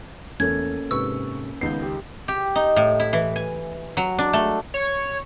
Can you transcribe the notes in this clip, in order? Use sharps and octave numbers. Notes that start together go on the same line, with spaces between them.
E2 A3 A#3 C#4 A4 G#6
G#2 C3 B4 C#6 E6
C#2 D#3 B3 G6 C7
G4
G4
D#4
A2
E4
E3
G#5
F#3
D4
A3
C#5